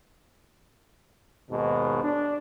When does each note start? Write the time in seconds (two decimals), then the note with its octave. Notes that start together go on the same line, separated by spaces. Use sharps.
1.51 D#2 G#2 B2
2.03 D4